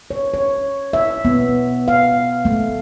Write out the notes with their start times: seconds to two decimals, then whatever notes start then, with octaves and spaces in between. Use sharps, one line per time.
0.11 C#5
0.34 C#5
0.93 E5
1.25 B3
1.88 F5
2.45 A3